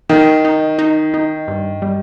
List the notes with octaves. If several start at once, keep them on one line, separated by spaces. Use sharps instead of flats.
D#3 D#4
D#4
D#4
D#4
G2
G3